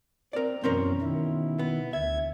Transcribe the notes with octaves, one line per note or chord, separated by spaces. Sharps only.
C4 A#4 D5
F#2 B2 E3 C4 C#4 A#4
B2 D#3 E4
B3
D2 E5 G#6